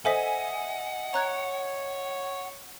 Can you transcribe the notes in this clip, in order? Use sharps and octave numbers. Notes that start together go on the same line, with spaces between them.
A4 C5 D#5 E5 F#5 G#5 B6
C#5 A#5 F#6 G#6